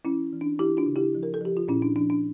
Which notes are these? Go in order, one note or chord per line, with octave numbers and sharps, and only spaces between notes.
E3 C#4 E4
E3
D4
E3 E4 G4
D4 F4
C#3
E4 G4
F3
A#4
A4
F3 G4
F4
A#2 C#4 E4
D4
F3 D4
D4